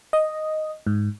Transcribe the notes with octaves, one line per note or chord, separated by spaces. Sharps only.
D#5
G#2